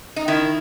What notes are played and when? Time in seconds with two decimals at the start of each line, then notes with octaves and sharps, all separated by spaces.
0.16 D#4
0.28 D#3 E4